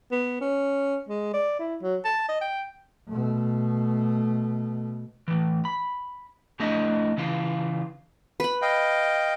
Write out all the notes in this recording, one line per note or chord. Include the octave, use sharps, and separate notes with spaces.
B3
C#4
G#3
D5
E4
F#3
A5
D#5
G5
B2 A3
A2 E3
B5
F2 A3 D4 E4 D#5 E5
C#3 E3 F4
B4 B5
D#5 F5 G5